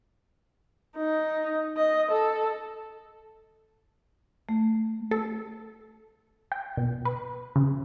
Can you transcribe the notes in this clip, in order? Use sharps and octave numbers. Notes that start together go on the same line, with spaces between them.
D#4
D#5
A4
A3
A4
G5
B2
B4
C#3